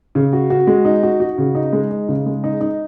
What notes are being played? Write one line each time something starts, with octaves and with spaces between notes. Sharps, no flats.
C#3
F#4
F#4
G#3
D#4
F#4
F#4
C#3
D#4
G#3
D#4
C#3
G#3
D#4
D#4